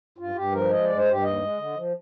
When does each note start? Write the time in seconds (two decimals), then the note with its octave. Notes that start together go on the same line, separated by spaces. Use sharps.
0.18 G2 F4
0.35 G2 G4
0.53 F3 A#4
0.70 G#3 D#5
0.84 G2 D5
0.97 C5
1.05 G2 G4
1.23 D#2 D#5
1.41 G#3
1.58 D3
1.75 F3